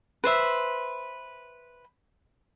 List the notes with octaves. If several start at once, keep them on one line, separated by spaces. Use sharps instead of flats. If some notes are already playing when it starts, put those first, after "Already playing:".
B4 C5 E5